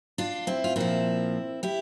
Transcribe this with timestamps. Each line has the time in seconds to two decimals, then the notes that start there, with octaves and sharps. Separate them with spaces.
0.18 D4 F4
0.47 C4 E4
0.64 F4
0.76 A#2 F3 C4 E4
1.63 E4 G4